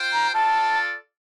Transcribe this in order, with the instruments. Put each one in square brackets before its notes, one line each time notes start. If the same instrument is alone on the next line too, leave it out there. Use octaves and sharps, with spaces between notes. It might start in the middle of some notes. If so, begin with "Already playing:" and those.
Already playing: [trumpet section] F4 C5 G5
[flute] A#5
[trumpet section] F4 A4 D5 [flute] A5